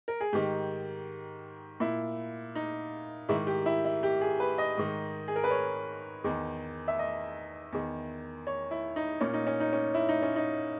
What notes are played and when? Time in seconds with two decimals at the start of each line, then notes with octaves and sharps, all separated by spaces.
0.08 A#4
0.20 G#4
0.33 G#2 D#3 G4
1.80 A#2 E4
2.55 D#4
3.29 G#2 D#3 E4
3.47 G4
3.66 E4
3.85 E4
4.03 G4
4.21 G#4
4.40 B4
4.58 D#5
4.77 G#2 D#3
5.28 G#4
5.36 A#4
5.44 B4
5.50 C#5
6.24 E2 D#3
6.88 E5
6.99 D#5
7.72 E2 D#3
8.47 C#5
8.71 E4
8.96 D#4
9.21 A#2 C#4
9.34 D#4
9.47 C#4
9.60 D#4
9.73 C#4
9.94 E4
10.09 D#4
10.22 C#4
10.36 D#4